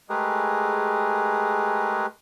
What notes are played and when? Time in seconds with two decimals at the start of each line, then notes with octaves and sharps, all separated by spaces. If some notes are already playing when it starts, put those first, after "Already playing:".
0.09 G#3 A3 G4 G#4 A#4 B4